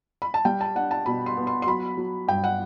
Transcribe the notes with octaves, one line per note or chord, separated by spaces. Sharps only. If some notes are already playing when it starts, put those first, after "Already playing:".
B5
A5
G3 G5
A5
D4 F#5
A5
B2 B5
C6
B3
C6
C6
F#3 B5
F#3
G2 G5
F#5